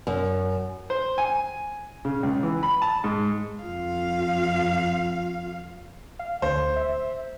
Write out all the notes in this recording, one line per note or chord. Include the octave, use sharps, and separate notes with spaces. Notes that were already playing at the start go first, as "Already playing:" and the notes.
F#2
C5
G#5
C#3
C#2
E3
B5
A5
G#2
F2 F4 F5
F5
D2 C5
E5